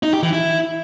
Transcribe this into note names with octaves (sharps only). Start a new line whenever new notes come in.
D#4
G4
E3
E4